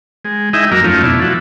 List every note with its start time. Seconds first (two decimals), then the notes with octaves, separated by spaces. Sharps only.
0.25 G#3
0.53 G#3 D#4 E4 D#5 E5 G5
0.71 F#2 F#3 A#3 A#5 D6 F6
0.84 F2 A3 C#4 D#4 F4
1.02 B2 D4 E4 A4
1.22 F3 E4 F#4